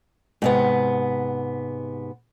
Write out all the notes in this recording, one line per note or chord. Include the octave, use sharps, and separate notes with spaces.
G#2 C3 B3